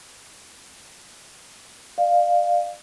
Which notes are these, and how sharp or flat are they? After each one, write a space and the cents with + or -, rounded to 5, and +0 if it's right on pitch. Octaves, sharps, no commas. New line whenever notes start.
D5 +30 F5 +0